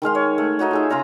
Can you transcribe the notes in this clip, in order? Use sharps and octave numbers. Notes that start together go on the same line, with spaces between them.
D#3 G#3 F5 C6
C#5
A3
A3 D#4 F#4 C#5
F4 G#4 E5
C#3 F4 A#5 C6